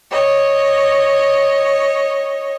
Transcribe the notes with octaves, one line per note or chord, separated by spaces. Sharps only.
C#5 D#5